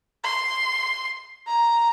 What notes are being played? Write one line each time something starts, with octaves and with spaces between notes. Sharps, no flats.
C6
A#5